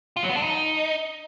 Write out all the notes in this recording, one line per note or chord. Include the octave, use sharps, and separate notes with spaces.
F4
F#3
B3
D4
D#4